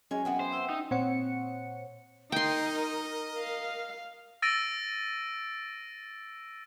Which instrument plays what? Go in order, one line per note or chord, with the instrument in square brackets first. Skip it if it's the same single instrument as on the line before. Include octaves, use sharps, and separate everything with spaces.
[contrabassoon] F#2 [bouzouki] G#3 C#4 [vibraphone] G#5
[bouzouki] E3 B3 C4
[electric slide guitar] C5
[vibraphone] E5 G5 E6
[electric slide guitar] D#4
[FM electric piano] A#2 C4 C5 C#5 F#5 C#7
[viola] D#4 [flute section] A#4 [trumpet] D#5 [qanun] G5 C6
[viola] F5
[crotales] E6 A6 A#6 D7 D#7